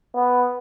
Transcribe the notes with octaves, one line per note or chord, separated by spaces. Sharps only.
B3